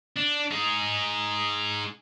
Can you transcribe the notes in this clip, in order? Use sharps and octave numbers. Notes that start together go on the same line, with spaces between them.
D4
D#4 G#4